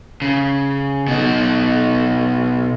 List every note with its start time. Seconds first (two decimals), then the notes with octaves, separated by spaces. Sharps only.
0.22 C#3
1.08 B2 D#4